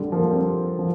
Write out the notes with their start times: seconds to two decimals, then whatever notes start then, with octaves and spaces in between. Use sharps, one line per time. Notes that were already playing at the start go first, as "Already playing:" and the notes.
Already playing: D3 G3
0.12 F3 A#3
0.31 G3 C4
0.79 F3